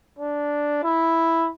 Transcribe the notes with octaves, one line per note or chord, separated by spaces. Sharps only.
D4
E4